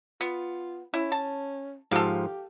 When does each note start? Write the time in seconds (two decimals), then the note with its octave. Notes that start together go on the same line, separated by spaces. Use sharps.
0.21 B3 F4
0.94 C#4 E4
1.12 A5
1.91 G#2 F3 G4 A4 F5